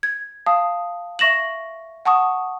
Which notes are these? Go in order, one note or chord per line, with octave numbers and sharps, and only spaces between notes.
G#6
F5 A5 D#6
E5 C#6 A#6 E7 F#7
F#5 A5 C#6 D#6